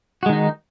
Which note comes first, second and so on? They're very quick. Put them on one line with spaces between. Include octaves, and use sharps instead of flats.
F#4 G#3 D#3 D#4